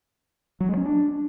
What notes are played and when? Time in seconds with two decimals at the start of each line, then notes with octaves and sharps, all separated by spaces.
0.60 F#3
0.69 G#3
0.77 C#4
0.86 D4